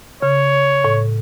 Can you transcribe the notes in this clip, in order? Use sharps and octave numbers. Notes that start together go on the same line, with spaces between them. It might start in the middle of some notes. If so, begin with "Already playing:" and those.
C#3 C#5
A2